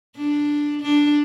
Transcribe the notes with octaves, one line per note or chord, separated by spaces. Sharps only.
D4
D4